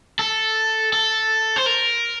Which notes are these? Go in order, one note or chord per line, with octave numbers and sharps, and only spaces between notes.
A4
A4
C5
A#4